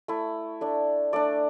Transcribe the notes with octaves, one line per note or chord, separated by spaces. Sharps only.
A3 E4
A3 D4
A3 D4 D5